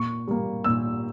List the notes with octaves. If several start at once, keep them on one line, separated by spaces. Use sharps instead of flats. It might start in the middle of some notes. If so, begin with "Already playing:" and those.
Already playing: A#2 C#6
G3 A#3
A#2 E6